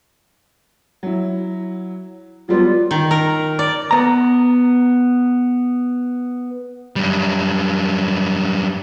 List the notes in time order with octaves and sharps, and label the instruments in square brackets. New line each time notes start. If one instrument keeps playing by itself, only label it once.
[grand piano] F#3 E4
[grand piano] F#3 G3 B3 [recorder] F4
[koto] D#3
A#4
D5
[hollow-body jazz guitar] B3 A#5
[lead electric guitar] F#2 G3